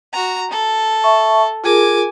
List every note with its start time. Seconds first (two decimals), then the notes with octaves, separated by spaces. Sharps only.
0.13 F#4 A#5
0.51 A4
1.04 E5 A5 C#6
1.64 F4 G#4 A#4 G#5 D6